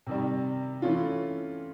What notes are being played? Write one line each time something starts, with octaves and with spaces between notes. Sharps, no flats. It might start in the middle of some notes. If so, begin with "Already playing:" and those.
C3 D#3 G3
E3 A3 C#4 F4